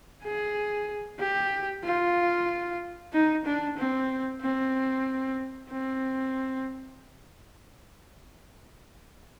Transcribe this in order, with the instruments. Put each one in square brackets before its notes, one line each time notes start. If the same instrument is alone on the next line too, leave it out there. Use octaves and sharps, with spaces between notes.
[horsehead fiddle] G#4
G4
F4
D#4
D4
C4
C4
C4